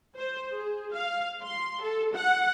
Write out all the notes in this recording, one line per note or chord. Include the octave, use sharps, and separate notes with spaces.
C5
G#4
F5
C6
A4
F#5